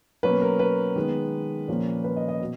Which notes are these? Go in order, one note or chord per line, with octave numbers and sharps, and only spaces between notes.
B2 F#3 A#3 C#4 B4
A#4
B4
D#3 G#3 B3
A#2 F3 A#3 C#4
B4
D#5
D#5
B2